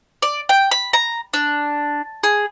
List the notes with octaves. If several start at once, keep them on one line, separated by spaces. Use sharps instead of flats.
D5
G5
B5
A#5
D4
G#4